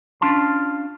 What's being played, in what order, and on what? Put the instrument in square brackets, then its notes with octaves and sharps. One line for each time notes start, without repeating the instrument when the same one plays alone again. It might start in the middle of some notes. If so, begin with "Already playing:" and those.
[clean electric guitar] C#4 D4 F4 A5 C6